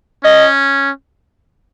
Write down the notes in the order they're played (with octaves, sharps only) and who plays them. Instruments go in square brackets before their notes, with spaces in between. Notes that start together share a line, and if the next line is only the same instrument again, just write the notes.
[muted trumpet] C#4 [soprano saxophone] D#5